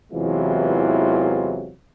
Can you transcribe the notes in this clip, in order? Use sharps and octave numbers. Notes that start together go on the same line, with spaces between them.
E2 C3 E3 F#3 G#3 F4